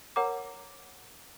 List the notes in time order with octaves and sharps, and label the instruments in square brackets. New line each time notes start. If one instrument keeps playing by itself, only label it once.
[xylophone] A#4 C#5 F#5 A#5 D6